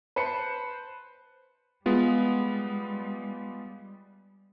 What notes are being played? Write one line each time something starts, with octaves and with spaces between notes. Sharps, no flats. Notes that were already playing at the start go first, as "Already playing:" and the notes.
B4 C5 A5 C#7
G3 G#3 B3 F4